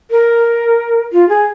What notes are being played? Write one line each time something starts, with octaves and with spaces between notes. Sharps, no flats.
A#4
F4
G#4